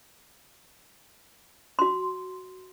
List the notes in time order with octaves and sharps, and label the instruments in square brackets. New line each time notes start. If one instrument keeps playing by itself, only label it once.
[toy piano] F#4 C6